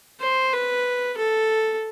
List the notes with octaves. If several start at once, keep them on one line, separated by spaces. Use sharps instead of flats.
C5
B4
A4